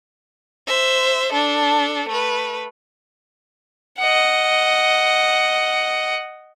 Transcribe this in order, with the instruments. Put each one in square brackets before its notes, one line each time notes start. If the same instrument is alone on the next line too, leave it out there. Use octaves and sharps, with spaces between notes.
[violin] C5 E5
D4 A4
A3 B4
[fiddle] D#5 F#5